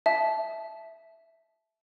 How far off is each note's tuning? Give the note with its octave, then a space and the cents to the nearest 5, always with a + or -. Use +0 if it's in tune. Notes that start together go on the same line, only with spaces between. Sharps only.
E5 +0 A5 -20